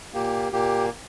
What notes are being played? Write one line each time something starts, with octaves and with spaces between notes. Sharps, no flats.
A#2 A#3 G4
A#2 A#3 G4